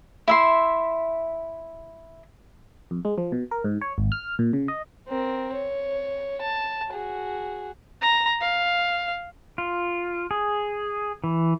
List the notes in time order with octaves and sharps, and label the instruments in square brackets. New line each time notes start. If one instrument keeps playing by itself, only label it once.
[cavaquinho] E4 E5 C6
[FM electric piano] F2
G#3
F3
B2
A#4
G#2
C#5
G#1
F6
A#2
C#3
D#5
[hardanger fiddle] C4 A#4
C#5
A5
F#4 G#4
[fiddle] A#5
F5
[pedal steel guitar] F4
G#4
E3